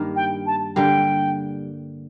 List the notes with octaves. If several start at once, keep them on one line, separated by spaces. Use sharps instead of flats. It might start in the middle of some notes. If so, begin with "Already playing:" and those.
Already playing: G2 D#3 A#3
G5
A5
D3 G3 A#3 G5